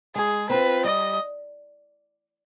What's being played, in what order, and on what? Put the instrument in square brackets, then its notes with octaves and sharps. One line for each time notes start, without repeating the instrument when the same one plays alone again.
[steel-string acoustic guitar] G#3 [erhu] G#4
[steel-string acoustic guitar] C4 F4 [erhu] B4
[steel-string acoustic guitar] G3 [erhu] D#5